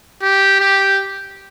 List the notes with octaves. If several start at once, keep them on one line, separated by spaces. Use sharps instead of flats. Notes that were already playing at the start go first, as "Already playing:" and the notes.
G4
G4